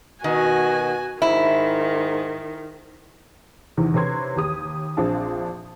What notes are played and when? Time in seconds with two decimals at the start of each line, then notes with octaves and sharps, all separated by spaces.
0.24 B2 D#3 F#4 G#5
1.22 G#2 D#3 E4
3.77 E2 C3 D#3 E3
3.94 C3 C#4 B4 C6 G#6
4.36 D#2 G4 D#6
4.97 A#1 C4 D4 F4 G#4 A5